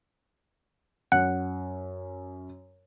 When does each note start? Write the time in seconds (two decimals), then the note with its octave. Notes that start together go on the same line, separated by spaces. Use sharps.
1.12 F#2 F#5